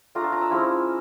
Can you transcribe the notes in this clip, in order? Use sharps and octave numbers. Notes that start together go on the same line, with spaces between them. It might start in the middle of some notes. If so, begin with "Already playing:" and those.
A3 D4 F4 A#5
A5
A#5
E6
F3 G#3 C#4 E4